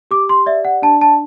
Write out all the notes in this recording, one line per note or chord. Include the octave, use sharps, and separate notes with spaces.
G4 D6
C6
D5 E5
F#5
D4 A5
A5